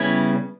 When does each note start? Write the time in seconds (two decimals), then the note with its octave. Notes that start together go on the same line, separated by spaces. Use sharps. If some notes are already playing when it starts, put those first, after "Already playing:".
Already playing: C#3 G3 B3 C#4 E4